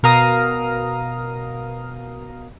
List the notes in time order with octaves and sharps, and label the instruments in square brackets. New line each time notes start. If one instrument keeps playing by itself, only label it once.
[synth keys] B2 A#4 F5 A#5 D#6 F6